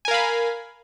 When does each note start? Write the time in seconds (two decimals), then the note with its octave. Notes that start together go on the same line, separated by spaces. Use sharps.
0.05 G#5
0.08 A#4
0.11 F5
0.14 B5